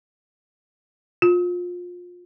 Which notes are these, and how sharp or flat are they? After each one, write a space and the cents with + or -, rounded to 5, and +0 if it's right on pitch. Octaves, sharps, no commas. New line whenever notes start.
F4 +25